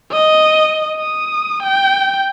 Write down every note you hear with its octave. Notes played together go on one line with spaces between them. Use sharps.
D#5
D#6
G5